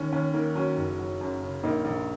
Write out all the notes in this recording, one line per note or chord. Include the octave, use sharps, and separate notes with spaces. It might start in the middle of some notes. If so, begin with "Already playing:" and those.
Already playing: D#2 C#4
D#2 C#4
D#3 A#3
F#3 C#4
F#1
F#3
F#2
C#3
A#1 A#3 D#4
A#1